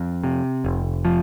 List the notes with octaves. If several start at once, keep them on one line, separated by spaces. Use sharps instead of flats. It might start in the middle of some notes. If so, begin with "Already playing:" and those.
Already playing: F2
C3
F1
F3